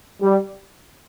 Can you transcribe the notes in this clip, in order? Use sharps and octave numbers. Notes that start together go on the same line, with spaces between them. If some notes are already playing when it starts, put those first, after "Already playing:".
G3